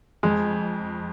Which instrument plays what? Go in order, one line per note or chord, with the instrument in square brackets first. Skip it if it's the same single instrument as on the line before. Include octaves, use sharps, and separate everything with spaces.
[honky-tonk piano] F2 [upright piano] G#3